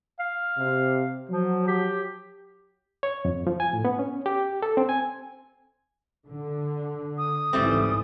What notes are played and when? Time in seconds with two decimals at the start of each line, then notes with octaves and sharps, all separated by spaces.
0.19 F5
0.56 C3
1.29 F3 F#3
1.68 G4
3.03 C#5
3.25 F2
3.47 F3
3.60 G#5
3.73 A2
3.85 B3
3.99 C#4
4.26 G4
4.62 A4
4.77 C4
4.89 G#5
6.26 D3
7.17 D#6
7.53 G#1 C#2 E3 G3 A3 C4